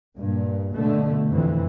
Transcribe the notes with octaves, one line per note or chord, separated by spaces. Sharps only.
G2 A#2
B2 D3 A3
F2 E3